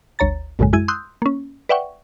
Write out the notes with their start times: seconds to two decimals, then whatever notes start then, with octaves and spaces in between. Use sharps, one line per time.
0.19 G1 D2 C#5 A#5 A6
0.59 A#1 F#2 A2 C#3 G#3
0.73 F#2 G#3 E4 G#6 D#7
0.88 C6 D#6 E6 F#6 G6
1.22 A#3 C#4
1.69 B4 D5 E5 F#5 G5 C#6